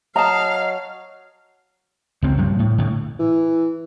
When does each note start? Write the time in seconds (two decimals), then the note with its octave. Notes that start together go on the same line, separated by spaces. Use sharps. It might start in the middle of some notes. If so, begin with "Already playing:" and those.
0.16 F#3 D#5 F5 A5 A#5
2.22 C#2 C4
2.38 G2 F3 G3
2.59 A2
2.78 A2 D3
3.19 E3